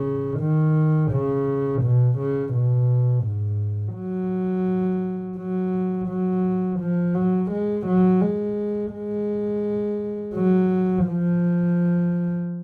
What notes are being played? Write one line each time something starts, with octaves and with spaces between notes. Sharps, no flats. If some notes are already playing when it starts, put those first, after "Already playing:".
Already playing: C#3
D#3
C#3
B2
C#3
B2
G#2
F#3
F#3
F#3
F3
F#3
G#3
F#3
G#3
G#3
F#3
F3